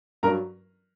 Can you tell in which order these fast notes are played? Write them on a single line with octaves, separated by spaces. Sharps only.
G2 A#4 A#5 F#3